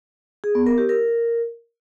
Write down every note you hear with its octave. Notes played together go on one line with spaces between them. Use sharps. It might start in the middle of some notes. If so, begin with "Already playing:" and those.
G#4
B3
A#4
G4
A#4